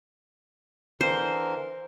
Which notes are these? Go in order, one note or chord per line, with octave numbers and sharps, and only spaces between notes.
D3 E3 A#4 C5